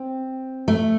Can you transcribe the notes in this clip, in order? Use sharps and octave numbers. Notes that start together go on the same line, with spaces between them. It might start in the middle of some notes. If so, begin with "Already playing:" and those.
Already playing: C4
A3